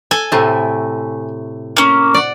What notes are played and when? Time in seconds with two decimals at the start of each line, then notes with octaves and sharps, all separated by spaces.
0.11 A4 G#5
0.32 A2 C3 A3
1.77 A#3 C#4
2.14 D5 F#5